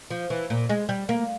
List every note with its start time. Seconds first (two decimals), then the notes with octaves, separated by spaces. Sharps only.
0.10 F3
0.30 E3
0.50 A#2
0.69 G#3
0.89 G3
1.09 A#3